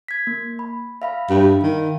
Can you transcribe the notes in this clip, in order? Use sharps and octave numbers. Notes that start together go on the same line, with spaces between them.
G#6 B6
A#3
B5
E5 F5 B5
G2
D#3